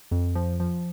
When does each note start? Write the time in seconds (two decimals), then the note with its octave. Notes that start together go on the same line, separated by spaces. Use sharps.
0.11 F2
0.35 F3
0.60 F3